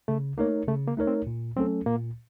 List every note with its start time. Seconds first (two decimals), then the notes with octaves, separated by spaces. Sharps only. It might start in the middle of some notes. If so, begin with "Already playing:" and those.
0.08 C#3 A3
0.38 A3 A#3 D#4 A#4 C#5
0.68 C#3 A3
0.87 A#3
0.97 A3 D#4 A#4 C#5
1.07 C4
1.27 A#2
1.56 F#3 A3 C4 C#4 A4
1.86 A#2 A#3